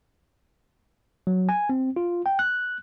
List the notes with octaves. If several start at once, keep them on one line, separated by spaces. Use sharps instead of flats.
F#3
G#5
C4
F4
G5
F#6